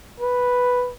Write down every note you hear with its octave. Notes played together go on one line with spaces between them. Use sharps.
B4